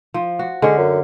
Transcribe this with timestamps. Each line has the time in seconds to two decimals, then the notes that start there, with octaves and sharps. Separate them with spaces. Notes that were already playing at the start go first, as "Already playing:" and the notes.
0.14 F3
0.39 F#4
0.62 D3 G#3 C#4
0.78 F#2